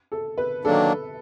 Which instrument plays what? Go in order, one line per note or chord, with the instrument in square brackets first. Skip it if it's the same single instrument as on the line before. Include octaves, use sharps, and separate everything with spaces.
[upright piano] A4
B4
[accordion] D#3 F#3 A#3 D4 [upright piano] A4